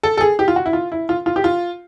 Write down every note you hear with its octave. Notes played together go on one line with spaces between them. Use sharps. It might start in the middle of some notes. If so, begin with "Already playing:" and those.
A4
A4
G#4
G4
F4
F#4
E4
F4
E4
F4
F4
G4
F4